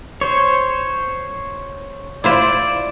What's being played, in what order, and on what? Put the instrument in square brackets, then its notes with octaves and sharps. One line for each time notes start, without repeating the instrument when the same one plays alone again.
[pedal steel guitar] C5 C#5
[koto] E4 F4 C5 [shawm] D5